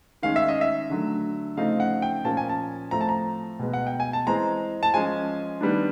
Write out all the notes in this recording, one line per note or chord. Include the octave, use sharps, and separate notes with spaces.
D#3 G#3 C#4 F5
E5
D#5
E5
D3 F#3 A3
C#3 F3 A3 C4 D#4 F5
F#5
G5
A#2 F3 A#3 C#4 A5
G#5
A5
A2 F3 A3 C4 A#5
A5
A#5
B2 G#3 B3
F#5
G5
G#5
A5
E3 G#3 C4 A#5
A5
F3 G#3 C#4 G#5
D#3 G3 B3 D4